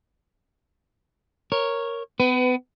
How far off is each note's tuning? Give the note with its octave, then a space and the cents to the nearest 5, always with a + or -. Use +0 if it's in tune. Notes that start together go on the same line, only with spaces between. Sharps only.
A#4 +0 C#5 -5
B3 +35 B4 +20